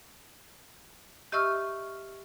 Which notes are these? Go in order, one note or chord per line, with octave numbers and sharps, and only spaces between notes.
G4 D#5 E5 C#6 E6 F6